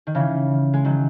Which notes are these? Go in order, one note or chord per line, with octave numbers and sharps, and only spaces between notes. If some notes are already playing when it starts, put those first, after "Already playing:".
D#3
C#3 E3
G#3
D#3 F#3